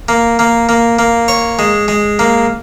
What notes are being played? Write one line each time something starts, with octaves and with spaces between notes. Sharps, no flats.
A#3
A#3
A#3
A#3
C#5
G#3
G#3
A#3